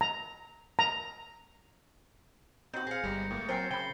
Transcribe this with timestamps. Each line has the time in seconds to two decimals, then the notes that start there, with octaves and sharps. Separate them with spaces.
0.01 A#5
0.79 A#5
2.74 C4 D#4 F#4 G6
2.87 G#4 F5 A#6 C#7
3.04 G1 G3 G#3 A#5
3.31 A2 A#3
3.49 F#3 C4 A#4 C5 G5 G#5 A6 C7
3.71 C#3 G5 B5 G7